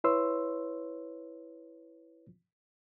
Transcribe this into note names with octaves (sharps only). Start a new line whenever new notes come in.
E4 B4 C#5 C6 E6